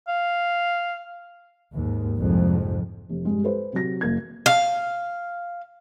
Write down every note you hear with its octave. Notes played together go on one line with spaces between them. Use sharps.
F5
D#2 G#2
C2 F2 G#2
F1
G2 G#3
A4 B4 C5
C3 F#3 A#6
F#1 A#3 G#6
F5